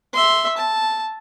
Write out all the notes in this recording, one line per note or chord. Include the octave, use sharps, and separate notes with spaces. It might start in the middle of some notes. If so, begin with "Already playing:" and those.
E5 C6
A5